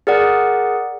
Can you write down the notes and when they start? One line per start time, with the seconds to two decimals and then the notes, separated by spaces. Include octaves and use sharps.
0.07 G#4 A#4 D5 F#5